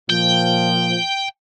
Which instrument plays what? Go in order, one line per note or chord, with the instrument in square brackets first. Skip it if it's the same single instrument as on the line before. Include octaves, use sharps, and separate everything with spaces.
[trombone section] A#2 F3 [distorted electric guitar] G5